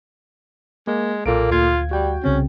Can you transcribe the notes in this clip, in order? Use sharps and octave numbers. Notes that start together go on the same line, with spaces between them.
G#3 A#3
B1 A#2 A#3 A4 D7
D2 F4 F5 G#6
G3 F#4 G5
C2 C#3 C4 C#4